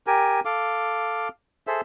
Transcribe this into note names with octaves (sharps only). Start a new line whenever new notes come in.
G4 A#4 G#5
A4 F5 D6
G#4 A4 C5 E5